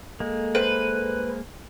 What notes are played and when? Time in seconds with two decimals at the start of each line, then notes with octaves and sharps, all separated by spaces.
0.20 G#3 A#3 A4
0.55 B4 C5